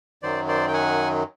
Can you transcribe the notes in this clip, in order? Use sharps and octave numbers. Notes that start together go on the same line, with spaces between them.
F#2 D#3 F#3 C5 D5
C5 D5
G5
F#5 G#5